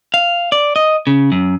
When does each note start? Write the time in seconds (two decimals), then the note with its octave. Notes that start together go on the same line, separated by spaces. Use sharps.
0.14 F5
0.52 D5
0.76 D#5
1.07 C#3
1.32 F#2